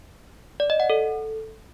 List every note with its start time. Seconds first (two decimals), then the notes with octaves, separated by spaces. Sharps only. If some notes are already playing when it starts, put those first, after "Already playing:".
0.60 D5
0.70 D#5
0.80 F#5
0.90 A4